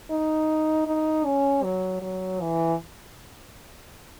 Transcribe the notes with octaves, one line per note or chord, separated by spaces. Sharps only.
D#4
D#4
C#4
F#3
F#3
E3